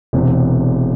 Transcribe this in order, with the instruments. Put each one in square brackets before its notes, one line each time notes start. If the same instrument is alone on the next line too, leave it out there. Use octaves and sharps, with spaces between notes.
[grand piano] E1 E2 C3